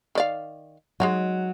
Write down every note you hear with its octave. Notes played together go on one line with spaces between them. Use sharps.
D#3 D5 F5
F#3 G#3 D#4 F#4